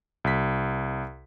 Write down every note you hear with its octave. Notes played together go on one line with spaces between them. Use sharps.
C2 B6